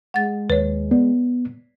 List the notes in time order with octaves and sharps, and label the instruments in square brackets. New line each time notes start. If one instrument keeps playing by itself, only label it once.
[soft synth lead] G#3 [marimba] F#5 A6
[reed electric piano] D#2 [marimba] B4 C#5
[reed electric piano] B3 [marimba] D5